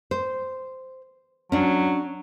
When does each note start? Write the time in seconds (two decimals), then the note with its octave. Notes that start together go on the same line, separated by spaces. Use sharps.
0.11 C5
1.52 F#3 C#4 D4